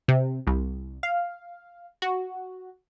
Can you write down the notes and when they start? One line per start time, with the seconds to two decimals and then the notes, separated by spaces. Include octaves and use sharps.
0.08 C3
0.47 C2
1.03 F5
2.02 F#4